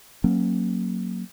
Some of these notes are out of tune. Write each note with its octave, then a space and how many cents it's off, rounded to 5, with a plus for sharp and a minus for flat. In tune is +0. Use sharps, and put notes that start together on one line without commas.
F#3 -5 A#3 -10 C#4 -30